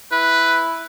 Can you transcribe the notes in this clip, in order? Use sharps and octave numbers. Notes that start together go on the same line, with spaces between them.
E4 B4